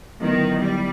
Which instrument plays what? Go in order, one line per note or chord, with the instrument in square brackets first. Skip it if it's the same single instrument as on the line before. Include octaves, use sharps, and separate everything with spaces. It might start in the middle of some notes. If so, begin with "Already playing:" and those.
[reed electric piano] D3 F#3 B3 E4 [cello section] D#3
[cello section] G3